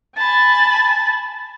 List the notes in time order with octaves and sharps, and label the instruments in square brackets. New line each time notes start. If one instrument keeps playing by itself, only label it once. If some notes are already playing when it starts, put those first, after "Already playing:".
[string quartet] G#5 A5 B5 [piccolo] A6